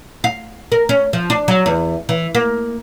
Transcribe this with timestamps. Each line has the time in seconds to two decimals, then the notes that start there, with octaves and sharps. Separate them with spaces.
0.24 F5
0.72 A#4
0.89 C#4
1.13 F3
1.30 D4
1.48 F#3
1.66 E2
2.09 E3
2.35 A#3